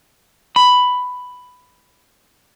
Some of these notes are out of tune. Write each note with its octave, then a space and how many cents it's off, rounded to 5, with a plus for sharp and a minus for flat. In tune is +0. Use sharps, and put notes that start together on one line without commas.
B5 +5